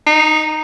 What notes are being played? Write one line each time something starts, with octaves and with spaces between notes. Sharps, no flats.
D#4